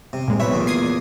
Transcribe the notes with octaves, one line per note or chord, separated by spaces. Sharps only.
C3
A#2 G#3
B1 B4 C#5 E5
E2 A#2
D#6 G#6 C7